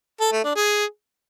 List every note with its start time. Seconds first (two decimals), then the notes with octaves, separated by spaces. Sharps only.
0.21 A4
0.32 A3
0.44 D4
0.56 G#4